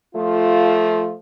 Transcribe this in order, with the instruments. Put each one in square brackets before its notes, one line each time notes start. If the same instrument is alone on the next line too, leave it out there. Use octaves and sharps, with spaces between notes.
[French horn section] F3 A3 F4